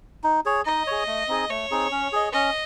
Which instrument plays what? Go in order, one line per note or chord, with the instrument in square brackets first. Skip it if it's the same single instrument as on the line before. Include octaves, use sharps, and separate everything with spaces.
[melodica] D#4
G#4 C#5
[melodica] D#4 [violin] D#5
[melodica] G#4 C#5
A3
C4 D#4 G#4
[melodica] A3 [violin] C#5
[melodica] C4 D#4 G#4
C#4
G#4 D#5
[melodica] C#4 [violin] D#5